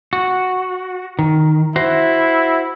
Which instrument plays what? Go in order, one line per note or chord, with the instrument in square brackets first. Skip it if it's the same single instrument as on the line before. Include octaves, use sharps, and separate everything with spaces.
[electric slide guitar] F#4
D#3
[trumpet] E4 [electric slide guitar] F#4 C5